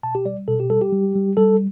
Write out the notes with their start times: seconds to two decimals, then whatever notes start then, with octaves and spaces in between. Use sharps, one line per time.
0.03 B2 A5
0.15 G4
0.25 G3 D5
0.48 B2 A4
0.60 G4
0.70 G3 A4
0.81 G4
0.92 G3
1.15 G3
1.37 G3 A4